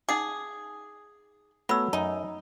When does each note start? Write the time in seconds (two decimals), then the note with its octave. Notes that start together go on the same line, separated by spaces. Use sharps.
0.09 D#4 G#4 F#5 D6
1.69 F#3 A3 B3 B5 E6
1.93 F#2 D#4